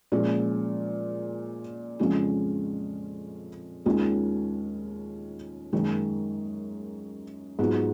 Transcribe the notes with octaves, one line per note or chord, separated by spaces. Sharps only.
A#2 F3 G#3 C#4 F4
F2 C#3 G#3 C#4 F4
D#2 D#3 G#3 C#4 F4
F#2 D#3 G#3 C#4
G#2 F#3 B3 F4